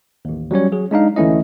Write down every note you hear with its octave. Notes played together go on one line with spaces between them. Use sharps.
A1 D#2
F#3 G3 C#4 C#5
F#3 G#4
G#3 D4 D#4 F5
D2 E3 A3 C#4 E4 D#5